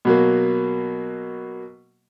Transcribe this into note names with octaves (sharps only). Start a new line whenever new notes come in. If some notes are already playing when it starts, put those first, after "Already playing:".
B2 F#3 A#3